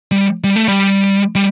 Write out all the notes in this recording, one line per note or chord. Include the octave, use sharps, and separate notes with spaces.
G3
G3
A3
G3
G3